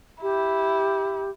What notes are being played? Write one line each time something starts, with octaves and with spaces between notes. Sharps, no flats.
E4 G4